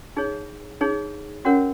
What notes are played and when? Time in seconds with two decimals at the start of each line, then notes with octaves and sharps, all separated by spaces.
0.17 D#4 G#4 C#5
0.81 D#4 G#4 C#5
1.45 C#4 F#4 A#4 C#5 F#5